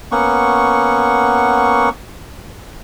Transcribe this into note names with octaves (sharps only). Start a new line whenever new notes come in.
A#3 B3 C#4 F#5 C#6